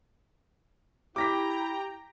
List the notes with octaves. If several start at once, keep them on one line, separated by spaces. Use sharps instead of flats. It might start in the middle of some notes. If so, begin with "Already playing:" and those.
E4 G4 G5 A#5 D6 A#6 B6